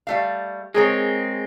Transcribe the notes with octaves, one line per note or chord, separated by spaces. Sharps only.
G3 A3 F5
G#3 C4 G#4 A#4 C#5